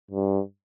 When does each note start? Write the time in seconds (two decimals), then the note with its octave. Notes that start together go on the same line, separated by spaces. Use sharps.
0.11 G2